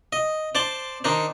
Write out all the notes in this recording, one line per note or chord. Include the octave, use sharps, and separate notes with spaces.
D#5
C5 D5 A5 C6
D#3 D4 D#4 C5